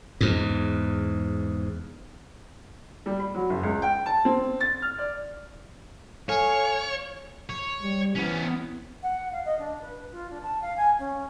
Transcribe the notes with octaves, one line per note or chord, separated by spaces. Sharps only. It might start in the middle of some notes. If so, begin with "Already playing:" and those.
E2 G#2
G3
B5
F#3
F#1
C#2
G5
A5
C4
A6
F6
D5
A4 C#5 F5 G#5
C#5
G3
E3 B3 C#4
F#5
F5
D#5
D4
B4
F4
D4
A5
F5
G#5
C#4